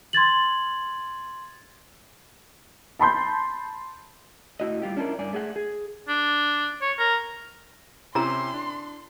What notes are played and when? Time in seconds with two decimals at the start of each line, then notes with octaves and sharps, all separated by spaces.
0.13 C6 G#6 A6 F#7
2.99 A5 B5 C6 G6
4.60 A2 E4 F#4 D#5
4.82 G3 F4 G4
4.97 C#4 D4 E4 F4 G4 A#4
5.19 G2 D5 G#5
5.33 A3 G#4 F#5
5.56 G#4
6.09 D4
6.82 C#5
6.98 A#4
8.15 C3 C#4 E4 G4 A#4 A#5 C6
8.54 D4